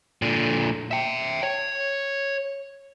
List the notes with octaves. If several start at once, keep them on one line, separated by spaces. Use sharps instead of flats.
A#2 D3
E5 G5
C#5